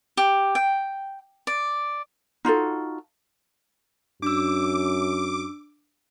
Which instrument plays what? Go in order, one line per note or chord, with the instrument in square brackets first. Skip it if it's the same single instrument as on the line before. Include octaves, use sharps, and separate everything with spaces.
[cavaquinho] G4
G5
D5
[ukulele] D#4 F4 F#4 A4
[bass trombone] F#2 [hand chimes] D4 E6 [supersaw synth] D6